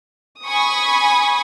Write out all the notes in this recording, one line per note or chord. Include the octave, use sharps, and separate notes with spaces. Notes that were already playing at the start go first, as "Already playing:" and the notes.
G#5 B5 C#6 D#6